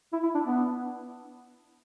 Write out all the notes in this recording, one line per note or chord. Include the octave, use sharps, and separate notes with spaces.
E4
E4
D4
B3